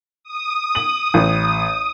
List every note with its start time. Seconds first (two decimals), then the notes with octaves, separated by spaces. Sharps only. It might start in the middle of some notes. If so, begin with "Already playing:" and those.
0.24 D#6
0.75 F#7
1.14 A1